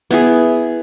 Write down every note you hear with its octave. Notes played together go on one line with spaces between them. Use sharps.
B3 E4 G#4